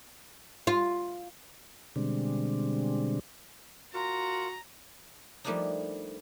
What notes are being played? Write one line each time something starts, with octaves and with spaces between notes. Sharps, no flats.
F4
B2 D3 G3 G#3 C4 D4
F4 F#4 A#4 A#5
F3 G3 A3 A#3 D4 D#4